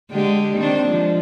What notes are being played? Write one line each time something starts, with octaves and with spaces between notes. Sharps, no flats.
D3 G#3 G4
D#3 C4 D4
F3 G#3